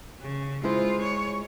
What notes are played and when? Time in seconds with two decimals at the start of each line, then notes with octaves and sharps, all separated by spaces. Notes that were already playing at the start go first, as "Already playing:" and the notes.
0.21 C#3
0.64 G#3 E4 F4 C5
1.01 C#5